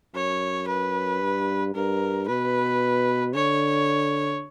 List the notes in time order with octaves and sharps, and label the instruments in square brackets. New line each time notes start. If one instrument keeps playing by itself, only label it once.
[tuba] F#2 [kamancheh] C#5
[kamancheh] B4
[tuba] G2
[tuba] G2 [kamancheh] A#4
[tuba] B2 [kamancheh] B4
[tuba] D3 [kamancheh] C#5